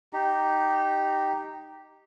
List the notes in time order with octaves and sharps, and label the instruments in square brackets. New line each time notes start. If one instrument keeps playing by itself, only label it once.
[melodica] D#4 G4